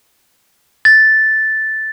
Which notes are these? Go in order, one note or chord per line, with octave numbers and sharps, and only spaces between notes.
A6